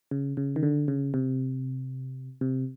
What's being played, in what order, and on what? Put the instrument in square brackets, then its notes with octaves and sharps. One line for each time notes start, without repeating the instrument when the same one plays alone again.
[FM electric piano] C#3
C#3
D#3
D3
C#3
C3
C3